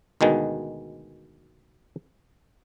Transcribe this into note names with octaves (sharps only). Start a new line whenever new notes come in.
D2 B2 D#3 G#3